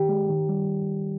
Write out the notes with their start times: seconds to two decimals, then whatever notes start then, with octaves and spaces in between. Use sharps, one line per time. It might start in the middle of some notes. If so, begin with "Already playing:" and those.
Already playing: D#3 G4
0.09 G#3
0.30 D#3
0.49 G3